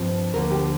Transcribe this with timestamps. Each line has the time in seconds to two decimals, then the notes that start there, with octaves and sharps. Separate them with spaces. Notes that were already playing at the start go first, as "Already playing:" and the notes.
Already playing: G2 F3 C4
0.34 D2 D3 F3 A#3 A#4
0.51 G4